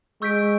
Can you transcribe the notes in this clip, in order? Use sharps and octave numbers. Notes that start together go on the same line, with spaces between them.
G#3 C#6 E6 G6 B6 D7